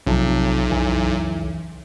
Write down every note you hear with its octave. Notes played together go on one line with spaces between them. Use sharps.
B1 C3 F3
C#2 F#2 E3